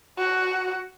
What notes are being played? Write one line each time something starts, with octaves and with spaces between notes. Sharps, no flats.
F#4